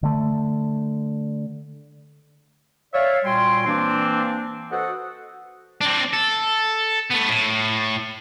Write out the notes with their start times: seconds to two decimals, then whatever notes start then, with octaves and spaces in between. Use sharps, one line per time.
0.03 D3 A3
2.93 C#5 D5 E5 F5
3.24 A#2 G3 F#4 G5 G#5 C6
3.66 E3 A#3 C4 D4
4.71 F#4 A4 B4 C5 D#5 F#5
5.81 C4 D4
6.13 A4
7.11 A3 B3
7.29 A2